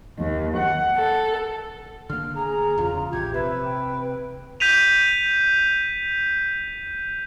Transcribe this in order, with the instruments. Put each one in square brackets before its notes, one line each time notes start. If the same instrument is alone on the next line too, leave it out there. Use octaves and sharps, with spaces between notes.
[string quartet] D#2
F#5
A4
[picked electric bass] D3 A#3 [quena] F6
[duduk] G#4 [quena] A#5
[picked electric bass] E1 E2 C#3 [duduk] F4
[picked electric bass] A#1 [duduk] G4 [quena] G#6
[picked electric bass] C3 [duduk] B4 [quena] E5
[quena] G5
[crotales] G6 B6 D#7 F7